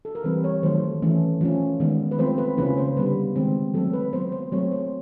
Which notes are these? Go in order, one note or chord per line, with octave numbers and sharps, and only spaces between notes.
A4
A#4
E3 G3 C4 B4
C#5
D#3 F#3 A3 C5
E3 A3 C#4
F3 A3 C#4
D#3 G#3 B3
B4
F3 A3 C4 C5
B4
C#3 F3 A#3 C#4 B4
C5
D3 G3 B3 B4
D#3 G#3 C4
F#3 A3 C4 A4
B4
F#3 B3 C5
C5
F#3 A3 C4 C#5
C5